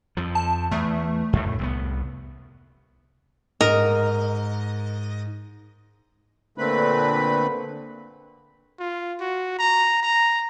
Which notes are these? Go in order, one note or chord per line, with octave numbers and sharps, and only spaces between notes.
F2 F3
A5
E2 A3
F2 A2
C2 G#3 B3
G#2 A#4 D#5
A#2 D3 A3 C4 B4 B5
F4
F#4
A#5
A#5